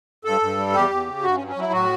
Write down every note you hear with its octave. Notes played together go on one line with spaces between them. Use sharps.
G2 A4
G2
G3
E2 G4
E2
C#3
G2 F#4
C#4
F#3
C#4
F#3 E4
A2 F#4